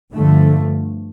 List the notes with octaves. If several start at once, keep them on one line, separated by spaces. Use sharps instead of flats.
G2 D3 F3 A3